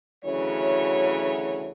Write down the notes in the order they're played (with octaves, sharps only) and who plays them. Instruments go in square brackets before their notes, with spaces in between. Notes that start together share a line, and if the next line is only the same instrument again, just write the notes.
[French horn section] D2 C#3 E3 F#3 C#5